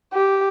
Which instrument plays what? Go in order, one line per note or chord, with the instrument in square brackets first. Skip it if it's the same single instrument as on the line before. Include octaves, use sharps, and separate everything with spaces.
[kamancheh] G4